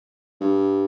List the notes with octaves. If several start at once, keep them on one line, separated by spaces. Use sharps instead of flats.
G2